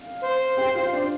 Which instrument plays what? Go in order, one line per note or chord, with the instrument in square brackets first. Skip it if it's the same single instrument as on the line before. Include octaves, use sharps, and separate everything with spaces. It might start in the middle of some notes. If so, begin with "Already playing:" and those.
Already playing: [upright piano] F5
[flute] C5
[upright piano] G4 G5
F4 F5
D4 D5